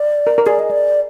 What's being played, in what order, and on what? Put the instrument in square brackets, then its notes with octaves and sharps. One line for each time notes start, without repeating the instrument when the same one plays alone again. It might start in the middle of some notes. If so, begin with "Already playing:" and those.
Already playing: [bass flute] D5
[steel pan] A#4
A#4
[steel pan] G#4 [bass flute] D5
[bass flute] D#5
D5